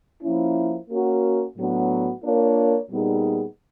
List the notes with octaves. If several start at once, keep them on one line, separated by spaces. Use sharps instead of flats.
F3 A#3 C#4 E4
A#3 C#4 F#4 A#4
A2 F#3 B3 D4 F#4
A#3 D4 F4 A#4 C#5
A#2 G3 B3 D#4 G#4